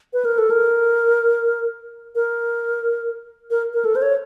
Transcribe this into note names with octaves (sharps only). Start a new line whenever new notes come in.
B4
A#4
A4
A#4
A#4
A#4
A#4
A4
C5
C#5